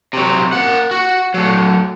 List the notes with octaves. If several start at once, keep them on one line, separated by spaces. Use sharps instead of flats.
C3 F#3
A#3 F#5
F#4
F#3 A3